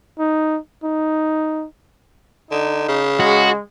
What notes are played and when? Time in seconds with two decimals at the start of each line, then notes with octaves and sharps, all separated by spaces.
0.19 D#4
0.84 D#4
2.51 D3 D#4
2.88 C#3
3.20 G#3 F#4